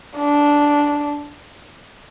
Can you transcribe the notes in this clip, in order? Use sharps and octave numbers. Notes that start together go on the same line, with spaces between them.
D4